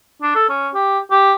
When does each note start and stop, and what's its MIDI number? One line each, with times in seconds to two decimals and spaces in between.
0.22 0.34 62
0.35 0.47 69
0.49 0.68 61
0.74 0.99 67
1.11 1.34 67